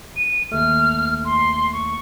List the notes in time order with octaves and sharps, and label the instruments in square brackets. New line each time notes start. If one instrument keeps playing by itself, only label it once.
[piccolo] D#7
[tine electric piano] D#2 A3 [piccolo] F6
[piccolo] C6
C#6